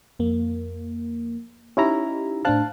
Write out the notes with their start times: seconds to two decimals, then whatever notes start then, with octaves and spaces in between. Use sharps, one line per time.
0.19 F2 A#3
1.77 C#4 D#4 E4 G4 A#5
2.45 A2 D4 C5 F5 A5 F#6